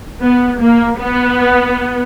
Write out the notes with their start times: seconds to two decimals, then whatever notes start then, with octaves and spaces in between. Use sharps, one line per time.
0.22 B3
0.61 A#3
0.99 B3